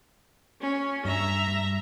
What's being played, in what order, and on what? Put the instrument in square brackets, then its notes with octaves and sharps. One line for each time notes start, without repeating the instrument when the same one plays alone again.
[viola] C#4
[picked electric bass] G2 [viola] E5 A#5
[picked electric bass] G2